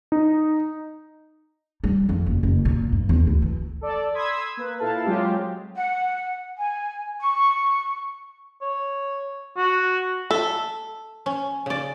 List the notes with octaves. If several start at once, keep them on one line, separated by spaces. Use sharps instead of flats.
D#4
G3
F2
F#1
F#1
A#2
G2
E2
D2
E3
A4 D5
B5 C6 D#6 E6 G#6 B6
A#3 B4
A#2 E4 A4 F5 A5
F#3 G#3 C4 F4 G4
F#5
G#5
C#6
C#5
F#4
A4 E5
C#4
C#3 D5